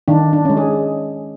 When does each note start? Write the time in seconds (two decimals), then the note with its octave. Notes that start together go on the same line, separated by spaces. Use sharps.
0.08 D#3 D4
0.33 D4
0.45 G#3 C#4
0.57 G#4